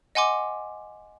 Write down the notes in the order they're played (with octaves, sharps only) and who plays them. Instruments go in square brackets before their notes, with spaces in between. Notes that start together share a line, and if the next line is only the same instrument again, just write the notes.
[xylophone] D#5 F#5 G#5 C6 D6